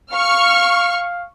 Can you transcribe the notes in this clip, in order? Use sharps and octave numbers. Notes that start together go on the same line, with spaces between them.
F5 C#6 F6